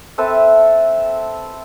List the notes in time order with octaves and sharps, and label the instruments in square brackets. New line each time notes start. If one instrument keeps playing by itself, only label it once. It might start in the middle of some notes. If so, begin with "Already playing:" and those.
[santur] C4 A4 B4 E5